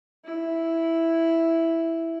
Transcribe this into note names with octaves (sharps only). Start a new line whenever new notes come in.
E4